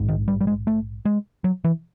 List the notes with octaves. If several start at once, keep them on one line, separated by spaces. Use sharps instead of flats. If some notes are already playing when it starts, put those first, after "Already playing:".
Already playing: A#1 G#2
D#3
G3
G3
G#3
A3
G#3
F#3
E3